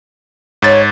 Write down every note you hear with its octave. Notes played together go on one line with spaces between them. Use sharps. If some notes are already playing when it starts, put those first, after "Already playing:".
G#2 C#5 A6